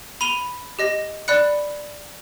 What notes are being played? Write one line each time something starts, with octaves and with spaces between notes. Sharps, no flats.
B5 D#7 F7 G7
G4 D#5 A#6
D5 B5 F#6 C#7